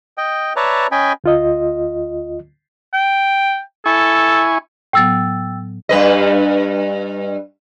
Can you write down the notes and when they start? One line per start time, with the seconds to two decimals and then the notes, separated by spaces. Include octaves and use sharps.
0.18 D#5 G5
0.56 B4 C#5 D5 E5 A5 A#5
0.92 C#4 D#5 G5 G#5 B5
1.24 D2 F4 D#5
2.94 G5
3.86 E4 A4 G#5 C#6
4.93 A2 F#3 B3 G5 E6 A6
5.89 G2 B4 D#5